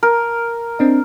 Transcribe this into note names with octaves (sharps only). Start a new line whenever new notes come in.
A#4
C4 D4 D#5